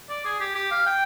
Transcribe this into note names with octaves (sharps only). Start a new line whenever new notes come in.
D5
G#4
G4
G4
F5
G5